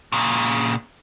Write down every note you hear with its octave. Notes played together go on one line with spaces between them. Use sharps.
A#2 C#3